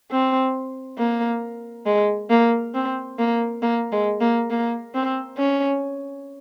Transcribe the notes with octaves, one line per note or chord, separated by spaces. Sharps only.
C4
A#3
G#3
A#3
C4
A#3
A#3
G#3
A#3
A#3
C4
C#4